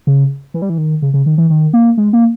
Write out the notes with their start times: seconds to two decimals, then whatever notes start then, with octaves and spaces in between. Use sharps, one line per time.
0.07 C#3
0.54 E3
0.62 G3
0.69 E3
0.78 D#3
1.02 C#3
1.14 C#3
1.26 D#3
1.38 E3
1.50 D#3
1.73 A#3
1.98 G#3
2.13 A#3